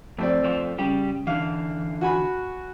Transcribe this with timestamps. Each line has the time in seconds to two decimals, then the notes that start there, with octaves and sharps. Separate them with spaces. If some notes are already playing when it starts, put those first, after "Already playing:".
0.18 F2 A3 C4 D5
0.44 F2 F3
0.78 C#3 G3 G4
1.27 D3 E3 F5
2.01 F#4 G#5 B5